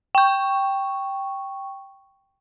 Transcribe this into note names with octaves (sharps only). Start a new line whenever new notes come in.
G5 C#6